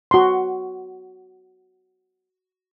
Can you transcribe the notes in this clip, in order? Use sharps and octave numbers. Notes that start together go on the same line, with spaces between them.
F#4 C6